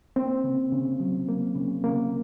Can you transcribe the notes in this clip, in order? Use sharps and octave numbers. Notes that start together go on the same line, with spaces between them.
A#3 C4
C#3
C#3
F#3
A#3
C#3
C#3 A#3